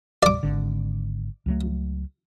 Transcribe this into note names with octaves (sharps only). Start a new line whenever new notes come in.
D5 D6
G#1 D3
C#2 F#3 A3